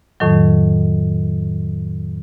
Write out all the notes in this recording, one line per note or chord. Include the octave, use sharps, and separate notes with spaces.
F2 A2 D#3 F#3